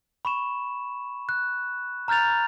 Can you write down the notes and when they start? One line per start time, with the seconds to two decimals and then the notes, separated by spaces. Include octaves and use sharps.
0.25 B5 C#6 E7
1.29 F#6
2.08 A#5 F6 G6 A6 F7